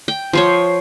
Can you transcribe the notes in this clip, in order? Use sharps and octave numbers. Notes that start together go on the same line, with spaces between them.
G5
F3 C5 C#5